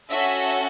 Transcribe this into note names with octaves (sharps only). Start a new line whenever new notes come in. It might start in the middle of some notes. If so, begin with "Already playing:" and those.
C#4 F#4 A4 E5